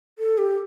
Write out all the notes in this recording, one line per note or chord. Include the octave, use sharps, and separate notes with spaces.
A4
G4